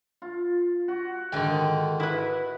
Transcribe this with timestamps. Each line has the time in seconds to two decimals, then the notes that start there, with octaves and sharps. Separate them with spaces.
0.22 F4
0.88 F#4
1.32 G#2 D3 D#3 G5
2.00 E4 B4 D#5